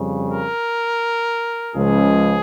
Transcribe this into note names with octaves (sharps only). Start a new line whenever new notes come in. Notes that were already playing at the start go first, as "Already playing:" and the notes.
Already playing: F2 C#3 G3
A#4
C#2 C#3 F3 G#3 G#4